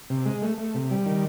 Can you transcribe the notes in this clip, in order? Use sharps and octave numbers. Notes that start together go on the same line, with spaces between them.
C3
G#3
A3
A3
C3
G3
D#3